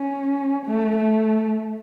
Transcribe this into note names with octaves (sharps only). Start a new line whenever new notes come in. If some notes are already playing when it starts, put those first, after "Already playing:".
Already playing: C#4
A3
A3